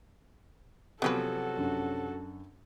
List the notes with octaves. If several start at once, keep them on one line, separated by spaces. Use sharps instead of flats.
C3 F3 F#3 B3 C#4 F#4 A4 B4
F#2 D4